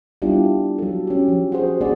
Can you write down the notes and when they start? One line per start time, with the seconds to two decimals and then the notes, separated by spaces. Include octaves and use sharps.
0.22 G3 B3 D4 E4 F4 G4
0.78 F#3 A4
1.07 C#4 G4
1.28 F3
1.52 F#4 G#4 C5
1.81 B3 D4 F#4 G#4 D5